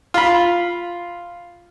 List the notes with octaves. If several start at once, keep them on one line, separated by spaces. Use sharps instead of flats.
F4 B5